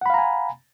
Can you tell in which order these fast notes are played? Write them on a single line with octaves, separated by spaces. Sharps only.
F#5 B5 F5 A#5 G#5